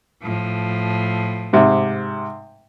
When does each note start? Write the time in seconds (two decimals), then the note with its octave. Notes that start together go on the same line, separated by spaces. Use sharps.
0.23 A2 F3
1.53 G#2 C3